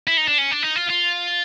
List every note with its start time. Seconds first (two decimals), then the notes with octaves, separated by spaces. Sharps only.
0.07 E4
0.17 D#4
0.28 D4
0.38 C#4
0.52 D4
0.63 D#4
0.76 F4
0.90 F4